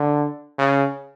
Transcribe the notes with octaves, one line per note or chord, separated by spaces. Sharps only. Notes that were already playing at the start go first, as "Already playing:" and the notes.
Already playing: D3
C#3